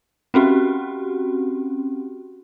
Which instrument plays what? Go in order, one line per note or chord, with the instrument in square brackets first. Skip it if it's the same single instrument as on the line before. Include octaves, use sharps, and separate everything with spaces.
[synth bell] C4 C#4 F#4 G4